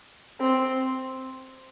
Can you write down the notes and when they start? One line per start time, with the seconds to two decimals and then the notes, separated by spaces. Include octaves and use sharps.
0.41 C4